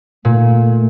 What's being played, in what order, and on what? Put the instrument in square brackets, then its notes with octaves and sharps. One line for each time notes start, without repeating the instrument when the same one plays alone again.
[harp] A#2 [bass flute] A3